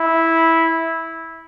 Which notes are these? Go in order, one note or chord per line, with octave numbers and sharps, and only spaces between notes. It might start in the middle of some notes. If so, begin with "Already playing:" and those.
Already playing: E4